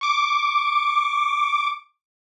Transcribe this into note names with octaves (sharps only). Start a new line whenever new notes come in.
C#6 D6